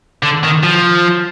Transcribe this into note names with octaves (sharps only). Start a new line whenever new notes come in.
D3
D#3
F3